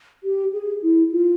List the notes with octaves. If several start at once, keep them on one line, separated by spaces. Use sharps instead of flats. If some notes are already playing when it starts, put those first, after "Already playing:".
G4
G#4
E4
F4